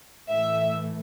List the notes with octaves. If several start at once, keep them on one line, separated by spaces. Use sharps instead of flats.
A2 E3 A3 E5